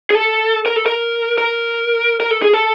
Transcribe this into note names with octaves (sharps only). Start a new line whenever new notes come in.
G#4
A4
A#4
A4
A#4
A#4
A#4
A4
G#4
A4